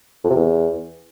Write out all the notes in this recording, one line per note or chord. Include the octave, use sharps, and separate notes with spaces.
F2
C3
E2